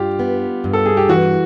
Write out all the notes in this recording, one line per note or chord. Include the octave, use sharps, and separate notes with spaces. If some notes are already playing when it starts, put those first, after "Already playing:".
Already playing: G2 F4 G4
B3
G2
A4
G#4
G4
E3 F#4